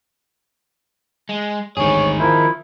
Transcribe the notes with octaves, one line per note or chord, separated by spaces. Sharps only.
G#3
A1 D2 G#2 D#3 G#4 C#5
F3 E4 A#4 C5